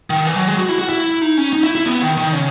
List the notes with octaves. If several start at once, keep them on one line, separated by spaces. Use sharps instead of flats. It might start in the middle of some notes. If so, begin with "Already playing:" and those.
D#3
E3
F#3
G#3
F#4
E4
F#4
E4
D#4
C#4
D#4
E4
E4
B3
D#3
D#3
C#3